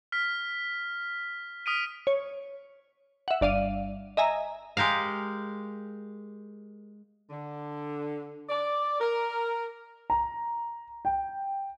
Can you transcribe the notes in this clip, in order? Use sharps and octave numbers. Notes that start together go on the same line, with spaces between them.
F6 B6
D#6 F6 B6 D7 D#7
C#5
E5 F#5
G1 D5 F5 D#7
D#5 E5 G#5 A#5
G#3 G4 A#4 F5
D3
D5
A#4
A#5
G5